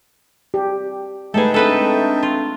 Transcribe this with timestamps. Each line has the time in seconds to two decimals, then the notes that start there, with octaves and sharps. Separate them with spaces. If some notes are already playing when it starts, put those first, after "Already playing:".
0.54 G4
1.34 G#3 A3 D#4 G#4 A4 B4 E5 G5
1.54 G#3 A3 C4 D4 A4 B4 D#5
2.23 F4